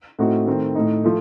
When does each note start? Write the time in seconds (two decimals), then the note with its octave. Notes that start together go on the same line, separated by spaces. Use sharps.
0.19 A2 A3 C4 D#4 F#4
0.47 D#3 A3 C4
0.75 A2 A3 D#4
1.04 F3 A3